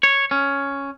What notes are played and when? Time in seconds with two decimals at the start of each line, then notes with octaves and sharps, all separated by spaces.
0.03 C#5
0.31 C#4